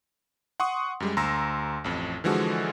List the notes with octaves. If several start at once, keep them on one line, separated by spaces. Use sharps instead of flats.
F#5 C6 C#6 D#6
F#2 G3 G#3
D2 A#5 C6 E6 A#6
A1 F2
D3 E3 F3 G#3 F#4 A4